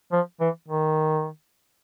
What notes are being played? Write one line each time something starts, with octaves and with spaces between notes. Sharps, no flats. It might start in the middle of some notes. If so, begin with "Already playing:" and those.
F3
E3
D#3